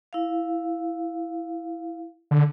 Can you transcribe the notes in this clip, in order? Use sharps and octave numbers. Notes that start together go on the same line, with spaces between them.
E4 F5
D3